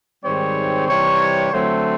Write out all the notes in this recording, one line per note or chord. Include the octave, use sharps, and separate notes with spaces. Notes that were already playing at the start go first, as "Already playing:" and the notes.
G#2 D#3 G3 C4 C#5
C3 E3 G3 C#5
D3 F#3 A3 C4 C5